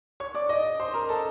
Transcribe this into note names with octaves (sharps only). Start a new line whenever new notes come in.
C#5 C#6
D5 D6
D#5 D#6
C5 C6
A#4 A#5
A4 A5